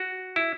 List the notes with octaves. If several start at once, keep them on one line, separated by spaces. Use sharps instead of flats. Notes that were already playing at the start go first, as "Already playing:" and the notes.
Already playing: F#4
E4